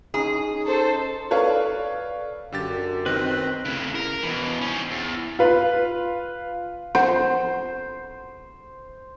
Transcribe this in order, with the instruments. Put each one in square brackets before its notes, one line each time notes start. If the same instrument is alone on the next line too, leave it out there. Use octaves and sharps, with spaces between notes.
[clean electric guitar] C#4 D#4 [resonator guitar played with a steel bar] G#4
[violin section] A4 C5
[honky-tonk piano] A4 B4 C#5 D5 F5
[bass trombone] F#2 [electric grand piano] D3 G4 A6
[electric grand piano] D#3 [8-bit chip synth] C4 [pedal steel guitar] B4 D#5 F#6
[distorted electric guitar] A2 C#3
A#4
B2 E3
C#4 C5
E2
[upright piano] F4 B4
[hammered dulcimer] C5 [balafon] F#5